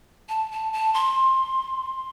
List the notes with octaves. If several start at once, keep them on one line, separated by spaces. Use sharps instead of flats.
A5
A5
A5
C6